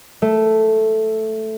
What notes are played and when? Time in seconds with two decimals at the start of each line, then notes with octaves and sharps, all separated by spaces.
0.22 A3